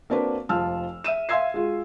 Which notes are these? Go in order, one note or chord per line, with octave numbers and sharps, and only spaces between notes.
A#3 C4 D4 F#4 B4
F1 F3 F4 A5 E6 F6
E5 E6 D#7 E7
E5 F5 C6 E6 G#6 C7
G#3 F4 F#4